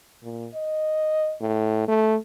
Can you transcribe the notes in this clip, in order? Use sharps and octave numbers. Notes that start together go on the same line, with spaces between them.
A#2
D#5
A2
A3